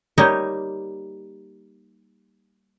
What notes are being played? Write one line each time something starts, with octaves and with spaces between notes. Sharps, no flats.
G3 A#3 D#4 G4 C#5 D#5